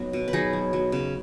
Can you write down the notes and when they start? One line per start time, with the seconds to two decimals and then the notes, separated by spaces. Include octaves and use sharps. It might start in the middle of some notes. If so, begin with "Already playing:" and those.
Already playing: F#3 B3 C#4 D#4
0.13 B2
0.28 B4
0.33 F#3 D#4 G#4
0.53 F#3
0.73 F#3
0.92 C#3